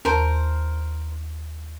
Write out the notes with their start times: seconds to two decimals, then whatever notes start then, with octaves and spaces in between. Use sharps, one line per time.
0.05 D#2 A#4 C5 A5